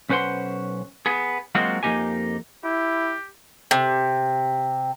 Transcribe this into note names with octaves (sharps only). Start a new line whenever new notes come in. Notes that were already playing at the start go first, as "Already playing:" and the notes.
B1 C#4 B4 C5 F#5 C6
B3 G#4
F#3 G#3 A#3 C4 F4 F#4
F2 F#3 A#3 D#4 G4 G#5
E4 G4
C3